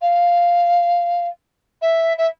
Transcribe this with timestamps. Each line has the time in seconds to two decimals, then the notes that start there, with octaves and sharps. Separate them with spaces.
0.01 F5
1.81 E5
2.18 E5